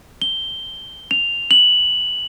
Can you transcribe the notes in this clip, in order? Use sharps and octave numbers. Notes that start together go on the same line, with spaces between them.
G7
F7
F#7